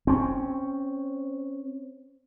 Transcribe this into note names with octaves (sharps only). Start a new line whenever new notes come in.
C4 C#4